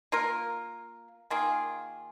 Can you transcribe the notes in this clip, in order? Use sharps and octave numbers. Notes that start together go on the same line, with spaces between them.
A#3 F4 A#4
D#3 A#3 F4 G#4